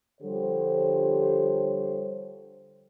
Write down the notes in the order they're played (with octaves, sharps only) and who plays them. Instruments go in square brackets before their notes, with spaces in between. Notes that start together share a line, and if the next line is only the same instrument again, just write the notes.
[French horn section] D3 F3 G3 G4 C5 C#5